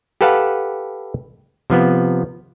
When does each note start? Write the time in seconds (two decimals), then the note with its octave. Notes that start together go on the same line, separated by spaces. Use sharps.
0.21 G4 A4 B4 F5 F#5 A5
1.70 C3 F3 B3